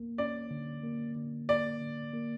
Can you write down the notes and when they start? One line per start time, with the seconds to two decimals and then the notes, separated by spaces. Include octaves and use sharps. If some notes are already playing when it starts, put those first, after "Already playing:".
Already playing: D2 A#3
0.18 C#4 D5
0.51 D3
0.83 A#3
1.16 D3
1.49 A#3 D5
1.81 D3
2.13 A#3